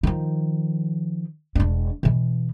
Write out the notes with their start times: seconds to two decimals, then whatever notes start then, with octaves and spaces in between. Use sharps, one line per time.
0.03 D#3 F3
1.55 E1 D4
2.03 B2 E3